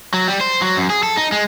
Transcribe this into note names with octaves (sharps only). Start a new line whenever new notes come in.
F#3
G3
C5
F#3
F#2
G#4
A4
D#4
G#3